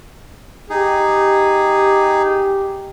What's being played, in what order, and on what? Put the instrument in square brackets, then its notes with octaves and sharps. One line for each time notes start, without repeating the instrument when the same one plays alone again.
[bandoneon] D#4 G#4 [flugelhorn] G4